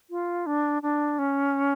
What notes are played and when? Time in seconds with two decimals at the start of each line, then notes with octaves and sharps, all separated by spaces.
0.10 F4
0.46 D4
0.82 D4
1.19 C#4